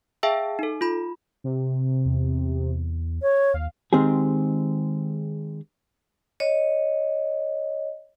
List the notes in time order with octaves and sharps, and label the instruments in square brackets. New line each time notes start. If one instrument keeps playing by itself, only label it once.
[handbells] G#4 E5 F5 G5 A5 E6
D#4 A4
F4 B5
[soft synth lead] C3
[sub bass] E2
[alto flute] C#5
[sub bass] D#2 [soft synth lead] F5
[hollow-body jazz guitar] D#3 G#3 C4 G4 G#4
[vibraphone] C#5 D#5